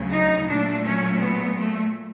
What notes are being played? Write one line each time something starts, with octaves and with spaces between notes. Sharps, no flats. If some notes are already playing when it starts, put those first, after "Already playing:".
Already playing: D2 C#3 F#3
D#4
A#2 F#3 A3 D4
C#4
B3
A3